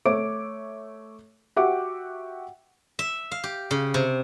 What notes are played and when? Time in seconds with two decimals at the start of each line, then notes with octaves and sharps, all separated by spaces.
0.05 A3 C#5 E5 D6 D7
1.56 F#4 G4 E5 F#5 D6
2.99 E5
3.32 F5
3.44 G4
3.71 C#3
3.94 C3